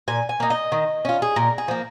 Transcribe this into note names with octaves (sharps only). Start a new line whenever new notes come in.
A#2 G#5
G#5
A#3 D#4
D#5
D#3
C#4 F4
G#4
A#2 A#4
G#4
F3 A#3